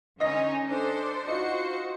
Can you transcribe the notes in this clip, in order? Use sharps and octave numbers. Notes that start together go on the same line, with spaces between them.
D3 C#4 D#4 D#5 A#6
D4 A4 C5
D#4 F4 F#4 C5 C#7